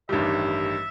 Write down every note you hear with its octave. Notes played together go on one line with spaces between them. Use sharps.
A1 G2 D#3 G3 E5